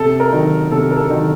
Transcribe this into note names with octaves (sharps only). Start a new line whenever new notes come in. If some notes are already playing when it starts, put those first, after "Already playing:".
Already playing: C3 A4
A#4
D#3 F#3
C3 A4
A#4
A4
D#3 F#3